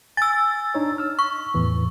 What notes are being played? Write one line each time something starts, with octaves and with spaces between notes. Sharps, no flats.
G#5 E6 A6
D4 D#4 C#5
E6 F6
C#6
E2 A2 E3